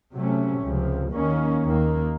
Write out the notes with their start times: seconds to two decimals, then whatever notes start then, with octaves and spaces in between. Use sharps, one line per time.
0.13 C3 F#3 A3 C#4
0.62 C#2 C3 F3
1.12 D#2 D#3 A#3 C#4
1.61 D#2 D#3 A#3